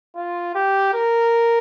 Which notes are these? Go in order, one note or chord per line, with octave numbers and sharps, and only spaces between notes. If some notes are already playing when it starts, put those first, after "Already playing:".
F4
G4
A#4